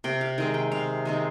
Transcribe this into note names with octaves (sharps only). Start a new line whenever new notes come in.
C3 G5
F5
D#3 G#3 C4 G5
G5
C3 F5
D#3 G#3 C4